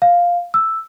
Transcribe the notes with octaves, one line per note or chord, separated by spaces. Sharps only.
F5
E6